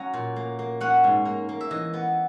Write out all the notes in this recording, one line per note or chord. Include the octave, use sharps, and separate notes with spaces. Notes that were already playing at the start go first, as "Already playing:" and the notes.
Already playing: F#3 C#4 A#5
A#2
A#3
A#3
C#4 F#5
G#2
A#3
A#3
E5
E3 D#5
B3